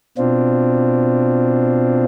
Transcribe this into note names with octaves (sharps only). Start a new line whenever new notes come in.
B2 C4 D4 F4